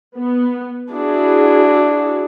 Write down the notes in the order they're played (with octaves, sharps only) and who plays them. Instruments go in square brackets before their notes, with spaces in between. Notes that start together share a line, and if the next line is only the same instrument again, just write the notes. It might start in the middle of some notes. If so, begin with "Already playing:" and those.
[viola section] B3
[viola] D4 [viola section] E4 F#4 G#4